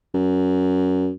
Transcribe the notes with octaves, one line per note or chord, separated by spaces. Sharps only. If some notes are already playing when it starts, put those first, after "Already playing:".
F#2